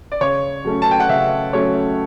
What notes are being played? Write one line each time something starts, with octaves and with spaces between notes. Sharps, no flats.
D5
C#3 C#5
F#3 A3 C#4
A5
G5
F#5
C#3 E5
F#3 A3 C#4 C#5